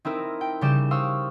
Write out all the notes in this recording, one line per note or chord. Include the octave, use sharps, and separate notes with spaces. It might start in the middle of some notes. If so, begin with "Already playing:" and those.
C4 D#4 E4 A#4
G5
C#3 G3 G4 G6 E7
C5 F5 C#6 D#6 E6